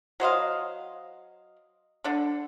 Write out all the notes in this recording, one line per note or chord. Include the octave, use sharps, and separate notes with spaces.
F#3 C5 D#5 F5
D3 D4